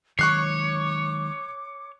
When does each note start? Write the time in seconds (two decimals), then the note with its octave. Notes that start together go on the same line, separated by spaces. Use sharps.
0.19 D#3 F#3 G#3 C#5 C#6 D6 F#6 C7